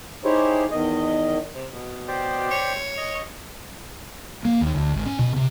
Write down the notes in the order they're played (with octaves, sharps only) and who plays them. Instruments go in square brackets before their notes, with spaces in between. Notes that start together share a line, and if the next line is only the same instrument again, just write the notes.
[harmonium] D#4 E4 G4 G#4 C5 C#5
E2 D#3 D#5
[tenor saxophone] C3
B2
[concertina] G4 C5 D5
[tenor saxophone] C#5
[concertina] D#5
[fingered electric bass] A#3
D#2
D2
G#1
C#4
B2
C3